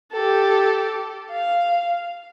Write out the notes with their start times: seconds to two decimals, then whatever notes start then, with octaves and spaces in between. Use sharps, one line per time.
0.12 G4 A4
1.31 F5